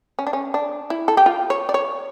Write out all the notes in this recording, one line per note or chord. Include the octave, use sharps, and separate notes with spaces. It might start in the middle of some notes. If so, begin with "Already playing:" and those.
C#4
D4
C#4
D4
E4
A4
G4
F4
C#5
D5
C#5